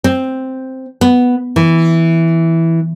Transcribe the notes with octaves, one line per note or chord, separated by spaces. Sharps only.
C4
B3
E3